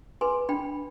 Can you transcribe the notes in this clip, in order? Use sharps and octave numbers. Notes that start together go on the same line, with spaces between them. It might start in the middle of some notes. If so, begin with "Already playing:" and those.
G#4 B4 G#5 C6
D4 G5 B5